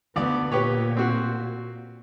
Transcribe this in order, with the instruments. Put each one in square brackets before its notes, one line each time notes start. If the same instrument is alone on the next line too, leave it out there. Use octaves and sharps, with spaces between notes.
[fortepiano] D2 D5 [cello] B3
[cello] A#2 [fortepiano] G4 B4 C#5
[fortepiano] C4 F#4